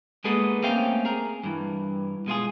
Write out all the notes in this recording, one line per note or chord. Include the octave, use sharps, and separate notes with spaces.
G#3 A#3 B3 D#4 G#4 A4
A3 A#3 C4 C#4 F5 G5
G#4 A#4
G2 E3
B2 G#3 F4 G#4